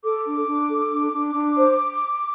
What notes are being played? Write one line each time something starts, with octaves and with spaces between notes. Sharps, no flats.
A4 D6
D4
D4
A4
D4
D4
D4
C5